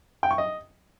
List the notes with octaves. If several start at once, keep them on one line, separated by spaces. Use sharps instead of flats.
G5
C#6
D#5